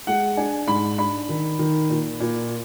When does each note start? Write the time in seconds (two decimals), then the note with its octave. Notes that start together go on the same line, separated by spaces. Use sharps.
0.07 G#3 F#5
0.37 D4 G#5
0.68 G#2 B5
0.98 D4 B5
1.29 D#3
1.59 D#3
1.89 A#2
2.20 A#2